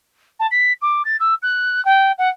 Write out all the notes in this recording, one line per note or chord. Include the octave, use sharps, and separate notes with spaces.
A5
B6
D6
A6
E6
F#6
G5
F#5